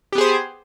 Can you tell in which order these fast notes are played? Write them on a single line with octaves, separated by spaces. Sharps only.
G4 B3 G#4 C5